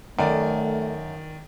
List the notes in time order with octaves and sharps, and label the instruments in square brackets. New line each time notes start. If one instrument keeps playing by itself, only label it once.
[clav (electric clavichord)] F#2 [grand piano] D#3 D5 [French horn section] A3